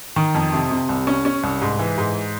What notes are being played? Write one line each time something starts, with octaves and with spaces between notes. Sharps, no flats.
D#3
F2
C3
C3
C2
C#4
C#4
C2
G#2
E3
G#2